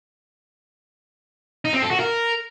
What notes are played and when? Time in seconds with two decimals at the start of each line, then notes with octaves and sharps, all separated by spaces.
1.65 D#4
1.74 C4
1.82 A4
1.91 F#4
2.00 A#4